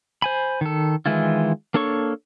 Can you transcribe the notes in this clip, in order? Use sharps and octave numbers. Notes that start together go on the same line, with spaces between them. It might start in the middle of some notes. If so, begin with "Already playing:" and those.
C5 G#5 B5
D#3 A4
D#3 E3 G#3 E4 F4
A#3 D4 A4 C#5 C#6